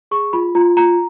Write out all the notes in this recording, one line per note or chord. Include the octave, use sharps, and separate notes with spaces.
G#4 C#6
F4 B5
F4 A#5
F4 A#5